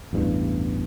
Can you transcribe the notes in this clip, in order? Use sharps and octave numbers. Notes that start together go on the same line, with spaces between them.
A1 E2 G2